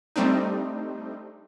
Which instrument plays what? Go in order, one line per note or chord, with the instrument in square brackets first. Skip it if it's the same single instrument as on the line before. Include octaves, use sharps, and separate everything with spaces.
[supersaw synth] G3 A3 C4 D4 D#4